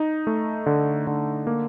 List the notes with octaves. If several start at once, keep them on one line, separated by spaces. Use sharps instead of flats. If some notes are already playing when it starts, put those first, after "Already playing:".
Already playing: D#4
A3
D3
D3
A#3